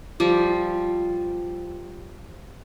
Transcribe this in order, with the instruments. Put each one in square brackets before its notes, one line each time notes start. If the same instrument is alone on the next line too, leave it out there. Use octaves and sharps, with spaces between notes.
[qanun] F3 G3